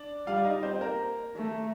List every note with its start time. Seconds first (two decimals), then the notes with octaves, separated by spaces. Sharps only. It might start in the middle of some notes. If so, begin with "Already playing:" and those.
Already playing: D4 D5
0.27 G3 F4 F5
0.38 D5
0.45 D#4 D#5
0.63 C4 C5
0.81 A#3 A#4
1.36 A3